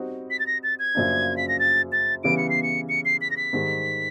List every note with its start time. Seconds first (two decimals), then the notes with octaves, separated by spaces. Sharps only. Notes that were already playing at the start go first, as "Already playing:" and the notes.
Already playing: G3 C4 D#4 F#4
0.31 B6
0.39 A6
0.47 A#6
0.63 A6
0.79 G#6
0.95 F#2 C#3 F3 A#3 D4
1.37 B6
1.48 A#6
1.59 A6
1.92 A6
2.24 C#3 E3 G3 B3 D7
2.38 C#7
2.50 C7
2.63 C#7
2.89 C#7
3.05 C7
3.21 B6
3.31 A#6
3.37 B6
3.53 G#2 D#3 G3